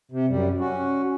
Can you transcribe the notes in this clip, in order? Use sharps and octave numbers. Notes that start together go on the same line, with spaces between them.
C3
F#2 G3
C#4 F#4